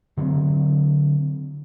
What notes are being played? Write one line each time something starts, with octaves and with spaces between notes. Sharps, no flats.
D3 F#3 A#3 C4